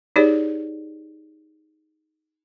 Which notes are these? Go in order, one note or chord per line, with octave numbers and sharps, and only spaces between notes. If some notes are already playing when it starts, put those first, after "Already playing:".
D#4 G4 G#4 C#5 D5